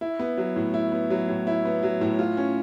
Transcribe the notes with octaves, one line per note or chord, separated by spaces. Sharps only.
E4
B3
F#3
A2
E4
B3
F#3
A2
E4
B3
F#3
A2
F4
C#4